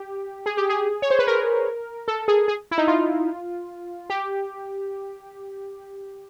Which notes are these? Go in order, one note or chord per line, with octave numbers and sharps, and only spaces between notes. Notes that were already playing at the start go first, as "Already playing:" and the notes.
Already playing: G4
G#4
G4
G#4
C#5
C5
B4
A#4
A4
G#4
G#4
E4
D#4
F4
G4